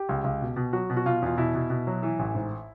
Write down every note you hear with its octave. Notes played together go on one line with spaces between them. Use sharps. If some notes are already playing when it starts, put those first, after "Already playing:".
Already playing: G4
C#2
C#2
B2
B2
F#3 F#4
B2
F#4
B2 F4
E2 F4
B2 E4
B2
B2
F#3
E3
A1
G#2